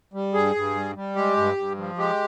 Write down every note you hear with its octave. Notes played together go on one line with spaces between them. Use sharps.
G3
G2 G#4
G2
G3
G3
G#3 G4
G2
G2
F3
G#3 G4